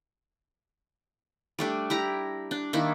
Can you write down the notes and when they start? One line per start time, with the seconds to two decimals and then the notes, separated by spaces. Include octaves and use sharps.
1.59 G3 A3 D4
1.90 E4 G4 A#5
2.51 D4
2.73 D#3 A#3 D4 E4